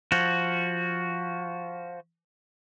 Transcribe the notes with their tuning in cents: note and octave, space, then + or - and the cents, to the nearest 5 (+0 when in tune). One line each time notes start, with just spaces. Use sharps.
F3 +0 F#4 +0